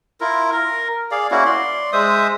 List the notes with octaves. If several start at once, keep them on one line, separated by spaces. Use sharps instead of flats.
E4 F4 A#4
A#4
G#4 D5 F5
A#3 C#4 E4 F#4
D5 C6
G#3 C5 E5 D#6